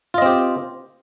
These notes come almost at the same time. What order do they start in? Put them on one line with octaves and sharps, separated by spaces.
F4 D#5 C4 G4